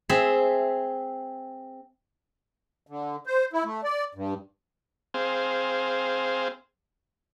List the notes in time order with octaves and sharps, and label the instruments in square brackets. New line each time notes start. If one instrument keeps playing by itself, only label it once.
[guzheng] C4 G#4 E5
[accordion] D3
C5
E4
A3
D5
G2
[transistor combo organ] C4 G#4 C5 F5